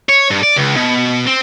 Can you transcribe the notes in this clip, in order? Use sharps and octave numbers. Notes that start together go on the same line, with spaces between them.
C#5
G2
D5
C#2
B2
C4